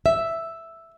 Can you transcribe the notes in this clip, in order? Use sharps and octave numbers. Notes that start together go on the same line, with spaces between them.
E5